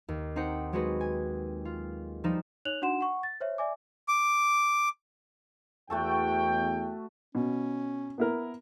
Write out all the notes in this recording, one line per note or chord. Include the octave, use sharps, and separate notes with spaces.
D#2
C4 D#4 C5 F#5 G5
F#3 G#3 C4 F#4 G#4 B4
G#5
F4
F3 G3 D#4 E7
D#4 C#5 F#6 F7 F#7
D4 D#4 F#4 F#5 C6 E7
F#5 C#6
A6
C5 C#5 E5
D5 E5 G#5 D6
D6
E2 A3 F#4 A4 G5
B2 C#4
B3 E4 A#4